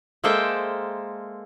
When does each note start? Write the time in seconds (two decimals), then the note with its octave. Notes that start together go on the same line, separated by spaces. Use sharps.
0.24 G#3 A#3 A4 C5 E5 G5